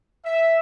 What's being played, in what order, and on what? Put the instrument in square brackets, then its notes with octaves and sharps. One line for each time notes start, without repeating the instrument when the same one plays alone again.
[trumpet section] E5